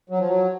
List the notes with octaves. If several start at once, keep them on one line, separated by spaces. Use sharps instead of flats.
F#3
F3
F#3